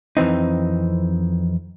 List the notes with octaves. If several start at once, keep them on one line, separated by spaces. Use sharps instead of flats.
F2 E3 C4 D#4